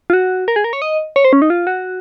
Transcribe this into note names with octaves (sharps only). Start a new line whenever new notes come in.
F4
F#4
A#4
G#4
A#4
C#5
D#5
C#5
C5
C#4
D#4
F4
F#4